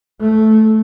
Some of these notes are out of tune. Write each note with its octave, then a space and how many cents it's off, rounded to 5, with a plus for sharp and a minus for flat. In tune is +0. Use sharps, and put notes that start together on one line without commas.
A3 -10